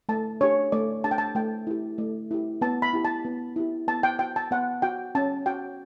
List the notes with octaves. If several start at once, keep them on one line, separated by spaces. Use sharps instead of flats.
A3 A5
D4 G4 C#5
A3 D5
D4 G4 A5
G5
A5
A3 G5
E4 G4
A3
E4 G4
B3 A5
B5
E4 G4
A5
B3
E4 G4
B3 A5
G5
F#4 G5
A5
B3 F#5
F#4 G5
C#4 A5
F#4 G5